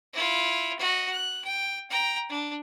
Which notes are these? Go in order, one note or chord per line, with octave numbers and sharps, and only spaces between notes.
E4 F4
F#4 D#5
F#6
G5
G5 A#5
D4